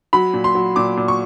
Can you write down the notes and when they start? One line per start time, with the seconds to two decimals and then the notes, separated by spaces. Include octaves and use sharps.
0.13 F#3 B5
0.34 A#2
0.44 C6
0.55 F#3
0.76 A#2 D6
0.97 A#2
1.08 C#6